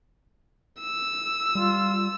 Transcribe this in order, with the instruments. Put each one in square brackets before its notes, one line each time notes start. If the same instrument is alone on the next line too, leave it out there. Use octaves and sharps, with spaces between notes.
[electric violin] E6
[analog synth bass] G3 [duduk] F4